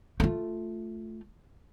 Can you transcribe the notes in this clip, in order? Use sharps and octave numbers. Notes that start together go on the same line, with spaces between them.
A3 F4